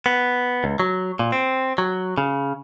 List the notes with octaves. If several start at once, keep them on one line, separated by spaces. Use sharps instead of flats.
B3
C#2
F#3
A#2
C4
F#3
C#3